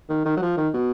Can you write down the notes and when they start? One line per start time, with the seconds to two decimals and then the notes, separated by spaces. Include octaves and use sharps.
0.09 D#3
0.25 D#3
0.37 F#3
0.42 F3
0.57 D#3
0.74 B2